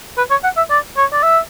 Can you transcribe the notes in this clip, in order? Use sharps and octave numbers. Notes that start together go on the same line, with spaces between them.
B4
C#5
F#5
E5
D5
C#5
D5
E5